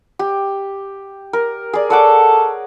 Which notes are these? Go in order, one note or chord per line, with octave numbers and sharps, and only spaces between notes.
G4
A#4
G#4 D5
A4 C#5 F#5 D6